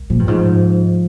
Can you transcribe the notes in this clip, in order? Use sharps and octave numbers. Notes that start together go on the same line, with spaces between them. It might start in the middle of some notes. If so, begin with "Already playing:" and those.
Already playing: C2
A#2 F3
G2
G#2 F3